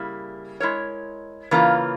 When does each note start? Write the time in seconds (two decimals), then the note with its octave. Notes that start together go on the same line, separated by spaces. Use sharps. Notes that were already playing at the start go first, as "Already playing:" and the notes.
Already playing: C#3 G3 A#3 E4
0.60 G#3 E4 A#4 C#5
1.51 C#3 E3 A#3 F4